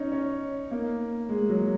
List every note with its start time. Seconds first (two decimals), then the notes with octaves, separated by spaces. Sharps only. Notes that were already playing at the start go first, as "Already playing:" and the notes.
Already playing: C#4 D#4
0.12 C#4
0.71 A#3
1.29 G#3
1.49 F#3